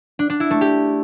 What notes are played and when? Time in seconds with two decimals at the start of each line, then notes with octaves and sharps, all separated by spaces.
0.19 D4
0.30 D4
0.40 E4
0.51 A3
0.61 G4